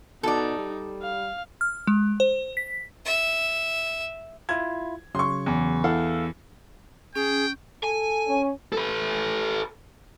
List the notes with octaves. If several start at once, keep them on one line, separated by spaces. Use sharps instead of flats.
B2 D#4 A4 D5
G3
F5
F6
G#3
C5
B6
E5
E4 F4 G#6
C#3 F#3 C6 C#6
E2
E4 A4 F5 F#5
C#4 G#4 G5
A4 G#5
C#4
A4 B4